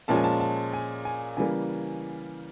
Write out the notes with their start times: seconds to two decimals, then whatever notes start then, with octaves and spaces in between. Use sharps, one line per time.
0.08 A#2 F3 G#3 C#4 A5
0.16 G#5
0.24 A5
0.40 A5
0.73 G#5
1.05 G#5
1.37 C#3 E3 G3 A#3 G#5